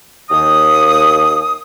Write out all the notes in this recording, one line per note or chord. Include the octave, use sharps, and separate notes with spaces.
D#2 D#6